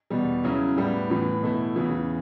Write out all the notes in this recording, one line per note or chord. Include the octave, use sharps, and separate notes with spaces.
E2 B2 G3
C#3 F#3 C#4 E4
A2 G3 B3 E4
A2 E3 B3
B2 A3 E4
E2 C#3 E3